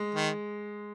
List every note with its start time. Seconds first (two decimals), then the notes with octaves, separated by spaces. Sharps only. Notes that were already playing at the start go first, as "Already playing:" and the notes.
Already playing: G#3
0.14 D#3